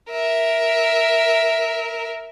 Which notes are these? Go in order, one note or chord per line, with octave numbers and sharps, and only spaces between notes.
A#4 E5